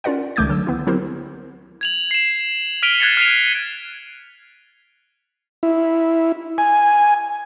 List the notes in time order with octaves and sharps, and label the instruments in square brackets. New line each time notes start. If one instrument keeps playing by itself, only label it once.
[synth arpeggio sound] C#4 F4 A#4 D5 F#5
C#2 D#3 A3 D6 G6 G#6
D3 F#3 E6
B3 E4
F#3 C4 E4 G4 A#4 C5
[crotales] G#6 F7 F#7
C7 E7
F6 B6 D7 D#7 F7 G7
F#6 G#6 A6 C7 C#7
F6 B6 C7 D#7 F7
[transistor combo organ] E4
G#5